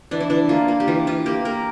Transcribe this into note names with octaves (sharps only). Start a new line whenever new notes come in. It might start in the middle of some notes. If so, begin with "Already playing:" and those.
E3 D4
E4
E3 D4
A#3 F4
A#3
G4
E3 F4
E3 F4
A#3 G4
A#3 A#4